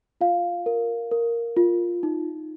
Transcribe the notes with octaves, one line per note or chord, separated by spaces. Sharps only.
F4 F5
A#4
A#4
F4
D#4